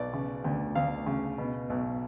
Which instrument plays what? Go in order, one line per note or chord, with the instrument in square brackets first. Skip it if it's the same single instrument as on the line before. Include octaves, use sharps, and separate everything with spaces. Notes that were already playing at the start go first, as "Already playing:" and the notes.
Already playing: [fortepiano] B1 D5
C#3
D2
D2 F5
C#3
B2
B1